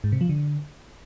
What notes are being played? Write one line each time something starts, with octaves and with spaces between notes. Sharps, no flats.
G#2
C3
F3
D3